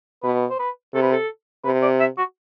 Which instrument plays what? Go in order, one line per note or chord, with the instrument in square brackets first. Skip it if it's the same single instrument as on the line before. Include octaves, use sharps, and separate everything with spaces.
[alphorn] B2 [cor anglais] B4
[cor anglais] C5
B4
[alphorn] C3 [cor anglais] A4
[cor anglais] B4
A4
[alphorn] C3 [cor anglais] B4
[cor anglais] D5
E5
F#4